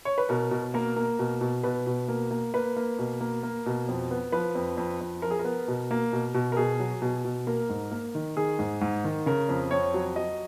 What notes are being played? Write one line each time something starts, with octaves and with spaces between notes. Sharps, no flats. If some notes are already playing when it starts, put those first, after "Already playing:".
C#5
B4
B2 A#4
B2
A#3 A#4
A#3
B2
B2
B2 B4
B2
A#3
A#3
A#3 B4
A#3
B2
A#3
A#3
B2
F2
B3
F3 B4
F2
F2
F2
F3 A#4
G#4
A#4
B3
B2
A#3
B2
B2
A#4
B2 G#4
F#3
B2
B2
A#3 A#4
G#2
A#3
D#3
D#3 G#4
G#2
G#2
D#3
C#3 A#4
F2
F2 C#5
F#3
F#3 D#5